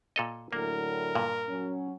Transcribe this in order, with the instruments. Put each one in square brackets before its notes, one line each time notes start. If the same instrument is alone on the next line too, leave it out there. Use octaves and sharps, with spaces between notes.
[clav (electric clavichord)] A#2 A4 D#5
[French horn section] A2 D3 F#3 [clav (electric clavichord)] A#3 [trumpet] A#4
[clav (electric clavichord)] G2 A#2
[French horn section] F#3 C#4